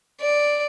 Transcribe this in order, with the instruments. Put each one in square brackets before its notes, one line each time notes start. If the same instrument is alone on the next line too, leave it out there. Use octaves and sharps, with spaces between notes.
[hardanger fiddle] D5